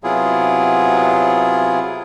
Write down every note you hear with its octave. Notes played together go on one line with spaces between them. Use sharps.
C3 F#3 B3 E4 F4 G#4